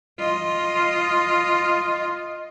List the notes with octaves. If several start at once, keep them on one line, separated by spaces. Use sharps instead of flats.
F4 D#5